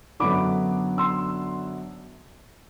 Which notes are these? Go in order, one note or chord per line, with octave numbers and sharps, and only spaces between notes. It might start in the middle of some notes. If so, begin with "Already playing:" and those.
F#2 D3 F#3 B3 D4 B5 D6
C6 E6